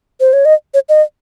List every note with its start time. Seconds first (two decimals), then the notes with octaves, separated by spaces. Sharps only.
0.20 C5
0.33 C#5
0.45 D#5
0.74 C#5
0.89 D#5